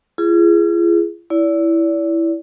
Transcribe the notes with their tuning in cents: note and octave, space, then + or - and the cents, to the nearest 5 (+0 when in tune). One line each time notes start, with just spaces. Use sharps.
F4 -45 G#4 +0
E4 +0 D5 -35